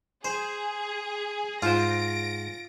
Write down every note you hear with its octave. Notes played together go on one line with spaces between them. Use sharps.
G#4 C5
G#2 F4 C5 A#6 D7